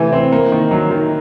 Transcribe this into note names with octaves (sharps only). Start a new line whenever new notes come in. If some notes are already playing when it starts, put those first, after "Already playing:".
Already playing: C3 E3 A3
C4
A#3
D#3
F#3
D#3